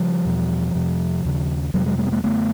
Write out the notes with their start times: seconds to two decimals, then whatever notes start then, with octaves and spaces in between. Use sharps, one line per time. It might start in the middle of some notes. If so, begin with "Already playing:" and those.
Already playing: C#3 F3 G3
0.25 E2 B2
0.75 F2 C3
1.25 D#2 C#3
1.74 F2 C3 F#3 G#3
1.86 F#3 G#3
1.98 G3 A3
2.07 B3
2.12 G#3 A#3
2.23 F#2 D3 A3 B3